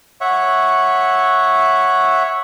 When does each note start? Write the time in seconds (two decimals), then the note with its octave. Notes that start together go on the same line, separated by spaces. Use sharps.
0.21 C#5 E5 F#5